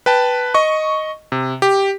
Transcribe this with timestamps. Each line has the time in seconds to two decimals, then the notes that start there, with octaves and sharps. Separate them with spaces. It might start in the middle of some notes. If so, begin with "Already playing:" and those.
0.06 B4 G5 A5
0.54 D#5 C#6
1.32 C3
1.62 G4